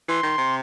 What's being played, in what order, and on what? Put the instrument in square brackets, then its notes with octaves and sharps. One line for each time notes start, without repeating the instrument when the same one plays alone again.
[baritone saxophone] E3 [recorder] C6
[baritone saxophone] D#3
C3